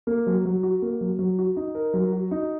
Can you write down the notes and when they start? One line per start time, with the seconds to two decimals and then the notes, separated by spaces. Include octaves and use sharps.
0.07 A#3
0.27 F#3
0.45 F#3
0.63 F#4
0.82 A#3
1.01 F#3
1.19 F#3
1.39 F#4
1.56 D#4
1.75 A#4
1.94 F#3
2.12 F#4
2.31 D#4